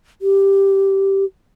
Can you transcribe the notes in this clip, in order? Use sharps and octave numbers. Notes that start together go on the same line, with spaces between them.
G4